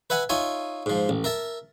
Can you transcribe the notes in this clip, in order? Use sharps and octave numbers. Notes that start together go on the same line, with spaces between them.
B4 E5 F#5 G#5
D#4 F4 C#5 E5 G#5
G#2 F3
A1
A#4 E5 A5